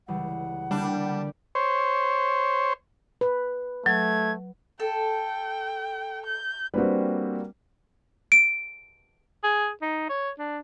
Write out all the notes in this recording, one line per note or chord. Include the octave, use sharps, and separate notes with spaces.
C#2 E3 G3 F#5
D3 G3 A#3 D4
C5 C#5
B4
F#3 A3 G#6
A4 G5
G6
G3 A#3 C4 D4 F#4 B4
D7
G#4
D#4
C#5
D4